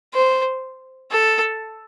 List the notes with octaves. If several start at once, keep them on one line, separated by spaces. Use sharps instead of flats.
C5
A4